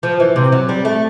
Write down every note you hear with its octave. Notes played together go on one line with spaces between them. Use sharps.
F3
E3
C3
F#3
G3
A3